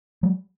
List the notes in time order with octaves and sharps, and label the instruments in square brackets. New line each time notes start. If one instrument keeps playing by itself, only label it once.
[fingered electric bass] F#3 G#3